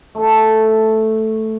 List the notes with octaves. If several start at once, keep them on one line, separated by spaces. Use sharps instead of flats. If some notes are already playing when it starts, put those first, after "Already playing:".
A3 A4